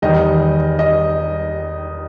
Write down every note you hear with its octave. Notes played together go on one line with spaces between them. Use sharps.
E2 D#3 G3 D#5
D#5